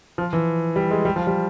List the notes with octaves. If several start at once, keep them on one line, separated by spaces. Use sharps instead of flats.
F3
E3
G3
G#3
G3
F3
G3